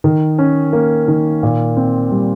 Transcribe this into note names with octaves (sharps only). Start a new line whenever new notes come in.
D#3
C#4
A#3
D#3
A#2
C4
G3